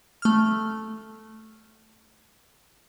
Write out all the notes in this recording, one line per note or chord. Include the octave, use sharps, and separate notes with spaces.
A3 F6